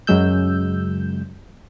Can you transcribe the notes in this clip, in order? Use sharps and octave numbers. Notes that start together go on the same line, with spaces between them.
F#2 C#3 F#3 G#3 E6 G6